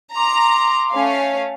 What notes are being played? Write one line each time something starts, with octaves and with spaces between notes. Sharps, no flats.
A#5 C6 D6
A3 C#4 F5